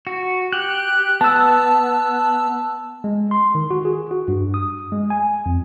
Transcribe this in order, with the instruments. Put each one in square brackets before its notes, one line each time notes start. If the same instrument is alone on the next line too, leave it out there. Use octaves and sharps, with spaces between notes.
[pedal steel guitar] F#4
[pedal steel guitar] G4 [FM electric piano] F#6
[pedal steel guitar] B3 [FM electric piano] A5 E6
[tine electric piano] G#3
C6
D#3
F#4
G#4
F#4
G2
D#6
G#3
G#5
F2